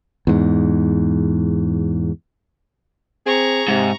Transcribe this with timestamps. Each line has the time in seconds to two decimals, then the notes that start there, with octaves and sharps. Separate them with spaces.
0.27 E2 G#2
3.26 C4 G#4 A#5 C#6
3.68 G#2 C3